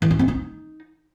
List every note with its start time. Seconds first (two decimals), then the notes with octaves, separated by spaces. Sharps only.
0.02 E3
0.11 D#4
0.19 C4
0.28 D#4